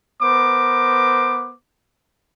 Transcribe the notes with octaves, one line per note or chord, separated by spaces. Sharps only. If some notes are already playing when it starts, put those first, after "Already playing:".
B3 A#4 C5 D6